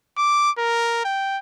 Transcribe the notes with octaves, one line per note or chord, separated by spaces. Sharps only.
D6
A#4
G5